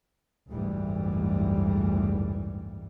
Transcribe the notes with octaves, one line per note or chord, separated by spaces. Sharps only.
F#1 D2 G#2 E3 G3